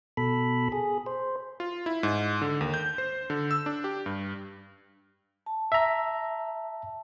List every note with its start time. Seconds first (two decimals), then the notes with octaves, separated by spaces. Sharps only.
0.17 B2 A4 B5
0.72 G#4
1.06 C5
1.60 F4
1.86 E4
2.03 G#2
2.41 D3
2.61 D#2
2.74 G6
2.98 C5
3.30 D3
3.51 E6
3.66 D4
3.84 G4
4.06 G2
5.46 A5
5.72 E5 A#5